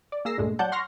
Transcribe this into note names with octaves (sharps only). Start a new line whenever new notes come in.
D5
A#3 G#4 E6 A#6 C7
C#2 G2 A#2 G#3 A3
F#3 D5 F#5 A5 G6
F#5 C6 C#6 F6 A#6